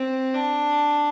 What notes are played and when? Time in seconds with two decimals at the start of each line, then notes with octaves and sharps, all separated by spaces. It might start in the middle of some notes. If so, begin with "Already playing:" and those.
Already playing: C4
0.35 D4